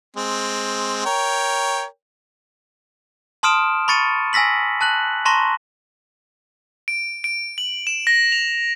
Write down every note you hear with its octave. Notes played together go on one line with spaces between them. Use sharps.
G#3 C4
A#4 C#5 G5
A5 C6 D#6 F6 D7 E7
B5 C#6 A6 C#7 D#7
G#5 E6 A#6 B6 F#7
A5 F#6 F#7
A5 A#5 C6 C#6 A#6
D7
D7
F#7
E7
A#6
F7